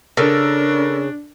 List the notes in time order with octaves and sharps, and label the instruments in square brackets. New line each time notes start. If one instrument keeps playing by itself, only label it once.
[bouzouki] C#3 [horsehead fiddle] D4 [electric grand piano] A4 A#4 E6